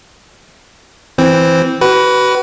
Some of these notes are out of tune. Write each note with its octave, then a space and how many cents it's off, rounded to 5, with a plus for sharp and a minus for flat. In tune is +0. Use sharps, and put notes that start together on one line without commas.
E3 +0 C4 +0
F#4 +35 B4 +0